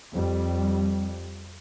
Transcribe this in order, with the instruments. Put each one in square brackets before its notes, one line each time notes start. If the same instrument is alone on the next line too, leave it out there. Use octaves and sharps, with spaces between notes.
[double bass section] F2 G3